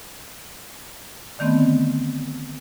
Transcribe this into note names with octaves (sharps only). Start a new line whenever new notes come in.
D3 D#3 A3 B3 C4